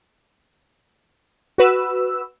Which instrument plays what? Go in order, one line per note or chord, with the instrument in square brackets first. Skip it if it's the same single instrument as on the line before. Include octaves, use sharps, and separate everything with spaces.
[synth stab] F#4 B4 E6